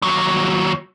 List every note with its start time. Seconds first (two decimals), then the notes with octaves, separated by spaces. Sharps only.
0.02 D#2 F#3